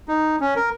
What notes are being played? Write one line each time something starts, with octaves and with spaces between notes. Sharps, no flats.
D#4
C#4
A#4